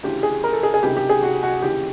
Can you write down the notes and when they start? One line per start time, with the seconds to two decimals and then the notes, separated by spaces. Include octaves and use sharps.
0.03 D2 C#3 E3 G4
0.23 G#4
0.44 A#4
0.53 A4
0.63 G#4
0.74 G#4
0.83 C#2 C3 D#3 G4
0.97 G4
1.09 G#4
1.23 F#4
1.43 F#4
1.62 D#2 C#3 E3 G4